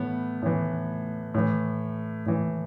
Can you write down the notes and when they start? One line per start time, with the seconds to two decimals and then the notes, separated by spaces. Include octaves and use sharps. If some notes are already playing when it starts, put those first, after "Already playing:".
Already playing: A2 E3 B3
0.42 A2 E3
1.34 A2 E3
2.26 A2 E3